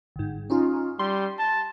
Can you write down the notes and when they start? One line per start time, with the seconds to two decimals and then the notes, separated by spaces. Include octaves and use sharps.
0.16 G1 G#2
0.50 C#4 D#4 F4
0.99 G3 C6
1.39 A5